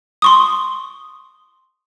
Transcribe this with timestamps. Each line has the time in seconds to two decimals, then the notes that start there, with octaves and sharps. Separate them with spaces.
0.22 C6 C#6 D#6